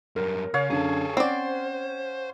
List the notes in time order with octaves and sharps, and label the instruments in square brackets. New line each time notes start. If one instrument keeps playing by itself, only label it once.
[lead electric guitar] F#2 G3 [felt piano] A#4
[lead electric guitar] C#3 [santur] C#5 F5
[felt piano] F#2 D3 [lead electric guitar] G#4 A4
[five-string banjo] C4 D5 [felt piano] C#4 F#5 [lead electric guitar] C5